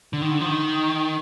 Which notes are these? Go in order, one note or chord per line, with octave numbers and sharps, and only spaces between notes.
D3
D#3
D3
F3
D#3